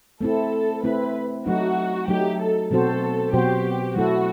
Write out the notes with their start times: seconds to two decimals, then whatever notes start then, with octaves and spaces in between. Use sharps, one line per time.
0.21 A3 C4 E4 A4
0.83 A3 C4 E4 B4
1.46 F#3 A3 D#4 F#4
2.08 F#3 A3 D#4 G4
2.39 A4
2.71 B2 F#3 C4 F#4 A4 C5
3.33 B2 F#3 C4 F#4 G4 C5
3.96 F#3 A3 E4 F#4 A4